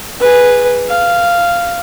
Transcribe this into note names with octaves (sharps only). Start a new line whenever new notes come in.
G#4 B4
F5